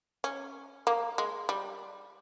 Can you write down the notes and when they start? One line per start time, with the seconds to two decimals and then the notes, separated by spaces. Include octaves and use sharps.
0.24 C#4
0.87 A#3
1.18 G#3
1.49 G3